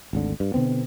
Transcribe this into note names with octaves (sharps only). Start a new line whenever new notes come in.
G#1 D2 D3
G2
B2 D3 B3 C4